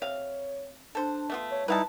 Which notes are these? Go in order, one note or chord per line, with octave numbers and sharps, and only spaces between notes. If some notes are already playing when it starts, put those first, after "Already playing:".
C3 C#5 F5
D4 A4 C5
A3 B3 F4
C#5
G3 D#4 E4 B4 F5 A5